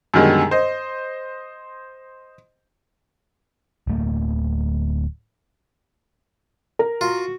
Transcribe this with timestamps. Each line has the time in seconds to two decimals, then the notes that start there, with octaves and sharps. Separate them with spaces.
0.14 F#2 B2 D3 D#3 G3 G#3
0.51 C5 D#5
3.87 D1 A3 A#3
6.79 A#4
7.01 F4 F#4